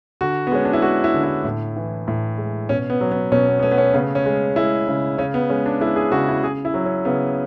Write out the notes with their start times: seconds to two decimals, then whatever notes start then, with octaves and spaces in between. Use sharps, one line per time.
0.21 D3 F#4
0.47 B3
0.52 G#3 C#4
0.65 D4
0.73 E4
0.82 G#3 F#4
1.04 E4
1.14 D3
1.23 E4
1.44 A2
1.77 E3
2.08 A2
2.38 G#3
2.69 B2 C#4
2.90 B3
3.01 F#3
3.12 B3
3.32 B2 C#4
3.47 B3
3.59 B3
3.63 A3 C#4
3.71 B3
3.78 C#4
3.94 C#3 B3
4.15 C#4
4.26 G#3
4.56 G#3 E4
4.88 C#3
5.18 C#3 C#4
5.34 B3
5.49 G#3 C#4
5.66 D4
5.80 G#3 E4
5.96 G#4
6.12 C#3 F#4
6.28 E4
6.43 C#3 G#4
6.65 E4
6.74 F#3
6.85 C#4
7.05 C#3 B3